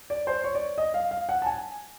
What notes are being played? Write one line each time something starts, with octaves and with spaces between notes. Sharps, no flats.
D5
C5
C#5
D5
D#5
F5
F5
F#5
A5
G#5